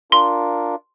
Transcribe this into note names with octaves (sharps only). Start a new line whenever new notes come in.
D4 F4 A#4 C6